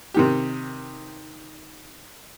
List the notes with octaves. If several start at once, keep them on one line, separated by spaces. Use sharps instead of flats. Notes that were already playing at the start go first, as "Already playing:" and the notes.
C3 D#3 G4